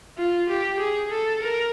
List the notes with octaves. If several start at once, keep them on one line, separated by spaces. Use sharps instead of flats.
F4
G4
G#4
A4
A#4